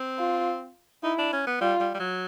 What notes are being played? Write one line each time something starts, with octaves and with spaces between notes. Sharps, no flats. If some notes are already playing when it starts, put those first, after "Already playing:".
Already playing: C4
F4
D#4 E4
D4
C#4
B3
G3 F4
G3
G3
F#3